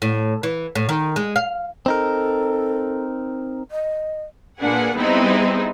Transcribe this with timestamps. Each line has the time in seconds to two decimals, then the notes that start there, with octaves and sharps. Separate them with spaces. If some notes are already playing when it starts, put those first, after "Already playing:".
0.02 A2
0.43 E3
0.75 A2
0.89 D#3
1.16 G#3
1.36 F5
1.86 C4 D#4 A4 A#4
3.71 D#5
4.60 A#2 A#3 D4 G#4 B4 F#5
4.97 G3 B3 C4 D#4 E4 G#4